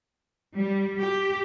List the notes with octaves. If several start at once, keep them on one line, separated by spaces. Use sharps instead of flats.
G3
G4